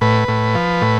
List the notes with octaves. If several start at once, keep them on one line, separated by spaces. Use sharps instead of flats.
A2 B4
A2
F3
A2